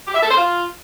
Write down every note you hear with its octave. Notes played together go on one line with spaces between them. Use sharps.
G4
E5
A4
C5
F4